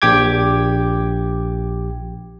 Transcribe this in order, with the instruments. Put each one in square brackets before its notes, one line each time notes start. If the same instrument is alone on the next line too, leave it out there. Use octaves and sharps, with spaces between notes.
[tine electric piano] A#1 G4 G5 D6 G#6